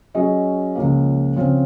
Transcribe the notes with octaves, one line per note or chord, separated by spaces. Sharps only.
F#3 C#4 G#4 D#5
C#2 C#3 F3 A#3
C#3 F3 C4 F4